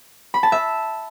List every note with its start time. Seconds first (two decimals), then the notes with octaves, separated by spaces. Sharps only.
0.34 B5
0.43 A5
0.52 E5